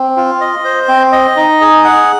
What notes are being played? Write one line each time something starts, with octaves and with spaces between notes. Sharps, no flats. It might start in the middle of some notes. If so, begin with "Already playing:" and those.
Already playing: C4
F4
D#5
C5
C4
D#5
D#4
G#4
F#5